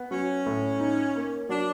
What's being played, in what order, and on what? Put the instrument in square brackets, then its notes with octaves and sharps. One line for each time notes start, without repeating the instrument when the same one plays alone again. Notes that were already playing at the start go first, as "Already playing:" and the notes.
Already playing: [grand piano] B3
[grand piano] F#3 [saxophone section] C#4
[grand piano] A2
D#4
A#3
[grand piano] F#3 [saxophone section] D4